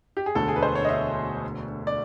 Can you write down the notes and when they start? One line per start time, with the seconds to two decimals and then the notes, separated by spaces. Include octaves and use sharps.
0.17 G4
0.26 G#4
0.35 E1 D2 D3 A4
0.48 G#4
0.56 B4
0.63 C5
0.75 C#5
0.84 D#5
0.89 E5
1.87 D5